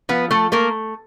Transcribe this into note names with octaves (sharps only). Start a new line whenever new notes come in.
F3 B3 B4
A3 A4
A3 A#3 A#4